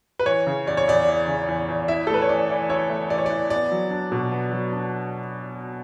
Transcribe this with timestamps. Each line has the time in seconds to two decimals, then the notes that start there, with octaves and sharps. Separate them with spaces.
0.19 B4
0.26 E3 C#5
0.47 C#3
0.67 E2 D5
0.77 C#5
0.88 E2 D5
1.08 E3
1.28 C#3
1.48 E2
1.69 E2
1.88 E4 E5
2.07 A3 A4
2.14 B4
2.22 C#5
2.29 E3 D5
2.49 E3
2.69 E4 C#5
2.90 A3
3.10 E3 D5
3.18 C#5
3.26 E3 D5
3.50 B3 D5
3.72 F#3
3.91 D4
4.12 B2
4.32 B3
4.52 F#3
4.72 D4